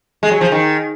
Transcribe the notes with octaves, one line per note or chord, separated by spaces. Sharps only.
G#3
F#3
F3
D#3